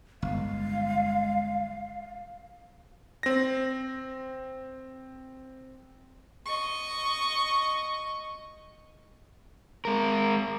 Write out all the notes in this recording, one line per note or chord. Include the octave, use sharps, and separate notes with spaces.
G1 G#3 F5
C4 A#6
D#5 C#6
G#3 A#4